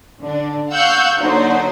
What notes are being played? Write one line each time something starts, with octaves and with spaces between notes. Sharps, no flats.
D3 D4
F5 F#5 C#6 E6 F#6 G6
D3 F#3 A#3 D#4 F#4 C5